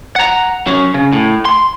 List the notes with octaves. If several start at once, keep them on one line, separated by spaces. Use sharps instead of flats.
F#5 A#5
F#3 C#4
C#3
A2
C6